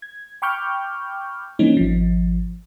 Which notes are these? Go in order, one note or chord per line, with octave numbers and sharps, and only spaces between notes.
G#6
G5 B5 C#6 D6 F6 G6
E3 G3 A#3 C4 C#4 D#4
G#1 F3